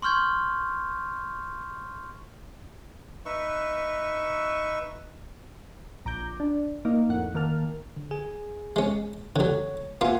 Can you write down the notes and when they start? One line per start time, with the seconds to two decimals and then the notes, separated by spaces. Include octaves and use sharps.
0.02 C6 C#6 F6 G6 G#6
3.26 D#4 B4 E5 C#6
6.05 A#1 A#5 D6 G6
6.40 D4
6.85 A#3 D#4
7.09 F2 A2 F#5
7.35 D#3 A#3 A#4 A5 F6
7.96 D3
8.11 G#4 G#5
8.76 G#3 C#4
9.36 D3 F#3 C#5
10.01 A#3 F4 E5 F#5 G#5